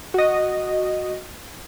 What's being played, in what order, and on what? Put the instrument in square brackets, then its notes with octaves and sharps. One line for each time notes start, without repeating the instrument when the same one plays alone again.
[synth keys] F#4 D#5